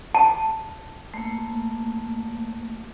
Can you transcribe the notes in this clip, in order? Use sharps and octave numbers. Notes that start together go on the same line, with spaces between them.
A5
A3 A#3